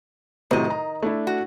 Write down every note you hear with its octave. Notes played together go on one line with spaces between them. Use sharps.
A2 C3 D#3 F#3 D#5
A#5
A3 D4 E4
F#4